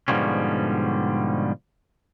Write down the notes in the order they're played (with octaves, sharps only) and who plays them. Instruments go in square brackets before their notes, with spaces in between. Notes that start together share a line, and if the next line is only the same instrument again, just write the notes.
[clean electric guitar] G#2 B2 D3 F3 G3 C#4